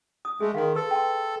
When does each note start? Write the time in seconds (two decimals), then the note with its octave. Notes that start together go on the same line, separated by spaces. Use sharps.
0.25 D#6
0.40 G#3 A3 G#4
0.54 D#3 F5 C6
0.75 A4 B4 E6
0.91 G5 C6